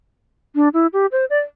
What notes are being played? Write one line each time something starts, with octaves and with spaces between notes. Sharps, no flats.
D4
E4
G4
C5
D5